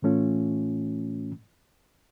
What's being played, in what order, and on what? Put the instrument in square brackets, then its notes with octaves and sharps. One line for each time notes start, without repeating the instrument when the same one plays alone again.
[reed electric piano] A2 E3 A3 C#4 F4